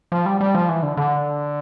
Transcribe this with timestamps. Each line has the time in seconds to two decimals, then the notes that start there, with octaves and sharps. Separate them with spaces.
0.12 F3
0.26 G3
0.41 G3
0.55 F3
0.69 E3
0.83 D3
0.97 D3